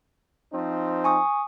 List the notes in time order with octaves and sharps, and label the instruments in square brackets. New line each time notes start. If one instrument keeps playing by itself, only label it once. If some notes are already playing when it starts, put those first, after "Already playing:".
[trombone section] F3 C4 D#4
[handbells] G#5 C#6 D#6